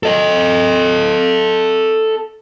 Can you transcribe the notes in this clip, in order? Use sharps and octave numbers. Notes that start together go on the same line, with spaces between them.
A4 D#5